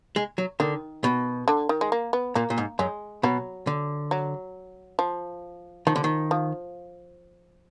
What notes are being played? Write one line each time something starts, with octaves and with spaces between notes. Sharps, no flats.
G#3
F#3
D3 D#3
B2
D3
D#3
G#3
A#3
B3
A#2 A#3
A#2
G#2
F#2 G#3
B2 F#3
D3
F#3
F3
D#3 F3
D3
D#3
F3